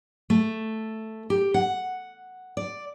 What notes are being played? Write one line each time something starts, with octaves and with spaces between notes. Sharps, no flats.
A3
G4
F#5
D5